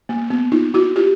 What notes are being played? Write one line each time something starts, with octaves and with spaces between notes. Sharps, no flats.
A#3
B3
D#4 F4
E4 F#4
F4 G4